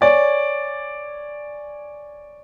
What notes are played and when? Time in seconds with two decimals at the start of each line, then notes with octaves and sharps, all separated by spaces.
0.01 C#5 D5 G#5